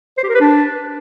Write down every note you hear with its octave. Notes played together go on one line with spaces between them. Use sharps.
C5
G4
A#4
B4
D4